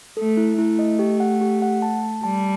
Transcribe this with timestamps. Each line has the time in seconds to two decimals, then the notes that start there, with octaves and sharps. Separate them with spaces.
0.17 A3 A4
0.37 E4
0.58 A3 E4
0.79 D#5
0.99 G4
1.20 F#5
1.41 G4
1.62 F#5
1.82 A5
2.03 A5
2.24 G3 A5